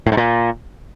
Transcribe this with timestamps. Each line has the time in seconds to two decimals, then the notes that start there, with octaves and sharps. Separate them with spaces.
0.07 A2
0.12 G#2
0.17 A#2